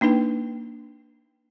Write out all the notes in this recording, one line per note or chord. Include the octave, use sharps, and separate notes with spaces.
A#3 D4 D#4 B4 G5